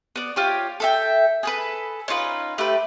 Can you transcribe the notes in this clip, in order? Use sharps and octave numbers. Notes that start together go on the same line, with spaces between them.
B3 D5
F4 G4 C#5
A4 E5 G5
G#4 A4 B4
C#4 D#4 F4 B4
A3 G4 B4